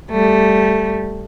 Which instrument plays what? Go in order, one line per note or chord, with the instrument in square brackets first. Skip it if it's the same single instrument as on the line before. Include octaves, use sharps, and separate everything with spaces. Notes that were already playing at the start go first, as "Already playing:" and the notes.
[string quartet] G3 A3